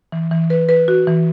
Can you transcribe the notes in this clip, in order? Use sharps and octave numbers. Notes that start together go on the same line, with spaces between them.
E3
E3
B4
B4
F#4
E3